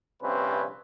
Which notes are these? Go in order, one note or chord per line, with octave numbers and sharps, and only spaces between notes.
A#1 G2 C3 C4 C#4 B4